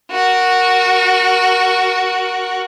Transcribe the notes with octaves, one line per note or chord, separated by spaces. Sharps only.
F#4 A#4